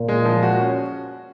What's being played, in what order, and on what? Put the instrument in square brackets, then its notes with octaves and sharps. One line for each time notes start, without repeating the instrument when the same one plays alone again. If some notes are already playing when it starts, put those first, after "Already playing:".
Already playing: [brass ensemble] A#2
[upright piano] G#3
F3
F#4
C#4